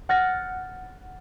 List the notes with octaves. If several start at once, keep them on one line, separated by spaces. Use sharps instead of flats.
F#5 F6 G6 A6 A#6